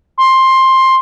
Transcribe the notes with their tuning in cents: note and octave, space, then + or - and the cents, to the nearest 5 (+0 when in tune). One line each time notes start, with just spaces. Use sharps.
C6 +10